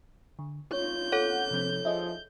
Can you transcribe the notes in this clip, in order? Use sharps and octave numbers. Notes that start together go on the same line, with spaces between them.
D3
F4 C#5 G6
A4 C#5 F#5
C3 F3 C4
F3 G#4 D#5 E5